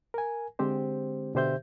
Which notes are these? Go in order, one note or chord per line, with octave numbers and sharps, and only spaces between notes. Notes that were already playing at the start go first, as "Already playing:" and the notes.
A#4 G#5
D3 G#3 C4 G4 C5
B2 D3 G4 C5 E5 G6